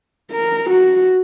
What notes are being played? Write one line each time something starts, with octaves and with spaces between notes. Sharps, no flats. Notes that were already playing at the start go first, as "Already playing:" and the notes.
A#4
F#4